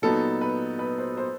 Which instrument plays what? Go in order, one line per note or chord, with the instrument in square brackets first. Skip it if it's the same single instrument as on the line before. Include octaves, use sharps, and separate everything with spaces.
[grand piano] A#2 F#3 B3 D#4 [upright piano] A4
[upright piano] B4
B4
C5
C5